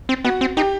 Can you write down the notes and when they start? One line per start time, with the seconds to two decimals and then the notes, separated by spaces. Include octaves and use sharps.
0.09 C4
0.24 B3 F#4 F#5
0.41 C4
0.57 D#4 G4 G5